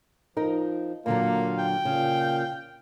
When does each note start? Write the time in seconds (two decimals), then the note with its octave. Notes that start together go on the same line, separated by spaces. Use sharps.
0.37 F3 D#4 A#4
1.06 A#2 D3 F#3 A#3 F4 F5
1.59 G5
1.85 A#2 C#3 F5